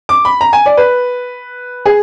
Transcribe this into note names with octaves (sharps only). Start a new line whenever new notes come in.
D6
B5
A#5
G#5
D5
B4
G#4